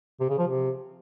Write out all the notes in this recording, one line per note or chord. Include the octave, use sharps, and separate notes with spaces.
C3
C#3
F3
C3